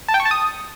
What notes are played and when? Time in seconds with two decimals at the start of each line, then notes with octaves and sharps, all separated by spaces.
0.08 A5
0.14 G5
0.20 C#6
0.25 A5
0.31 D#6